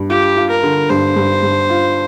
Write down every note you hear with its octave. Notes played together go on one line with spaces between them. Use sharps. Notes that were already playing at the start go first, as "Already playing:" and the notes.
Already playing: G2
F4 G4
F4
A#4
D3
G2 C5
G2
G2
F4